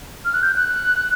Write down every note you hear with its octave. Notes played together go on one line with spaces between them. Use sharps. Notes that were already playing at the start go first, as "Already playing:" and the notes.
F6
F#6
G6
F#6